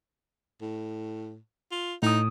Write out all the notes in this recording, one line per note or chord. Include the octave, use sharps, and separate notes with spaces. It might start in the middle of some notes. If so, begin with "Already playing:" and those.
A2
F4
A2 D#4 D#6